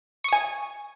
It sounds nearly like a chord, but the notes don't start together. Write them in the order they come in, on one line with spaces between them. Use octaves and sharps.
C#6 D#6 G#5